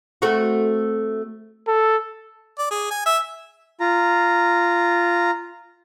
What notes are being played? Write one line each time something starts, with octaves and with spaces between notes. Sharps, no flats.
A3 C4 F#4
A4
D5
G#4
G#5
E5
F4 A#5